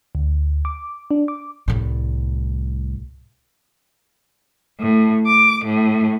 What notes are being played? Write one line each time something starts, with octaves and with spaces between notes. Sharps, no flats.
D2
D6
D4
D6
C2 A2
A2
D6
A2